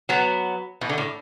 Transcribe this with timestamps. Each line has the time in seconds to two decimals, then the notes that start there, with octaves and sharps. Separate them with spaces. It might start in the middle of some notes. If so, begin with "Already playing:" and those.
0.09 F#3 B3
0.81 B2 E3
0.89 D3
0.98 A2